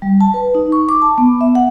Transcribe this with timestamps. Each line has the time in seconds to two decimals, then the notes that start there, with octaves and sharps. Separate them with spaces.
0.02 G3
0.21 A5
0.34 B4
0.55 D#4
0.72 C#6
0.89 D6
1.02 A5
1.18 B3
1.41 E5
1.55 F#5